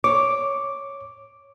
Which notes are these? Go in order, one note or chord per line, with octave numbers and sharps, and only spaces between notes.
C#5 D6